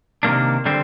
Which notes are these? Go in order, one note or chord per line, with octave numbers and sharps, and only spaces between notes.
C3 D#3 A#3 D4
D3 G3 C4